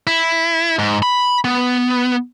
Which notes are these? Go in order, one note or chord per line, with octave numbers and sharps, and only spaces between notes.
E4
G#2
B5
B3